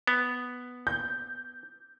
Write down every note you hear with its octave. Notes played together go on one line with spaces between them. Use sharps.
B3
G6